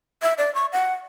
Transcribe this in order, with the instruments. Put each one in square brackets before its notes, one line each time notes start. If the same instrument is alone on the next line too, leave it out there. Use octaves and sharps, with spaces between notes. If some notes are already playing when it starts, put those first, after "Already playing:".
[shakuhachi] E5
D5
C#6
F#5